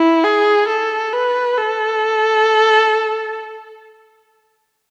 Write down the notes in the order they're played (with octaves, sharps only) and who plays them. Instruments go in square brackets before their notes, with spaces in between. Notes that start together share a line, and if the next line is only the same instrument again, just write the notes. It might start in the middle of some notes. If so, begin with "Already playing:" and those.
Already playing: [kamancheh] E4
G#4
A4
B4
A4